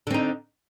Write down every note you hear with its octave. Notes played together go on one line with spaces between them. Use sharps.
D3 C4 D#4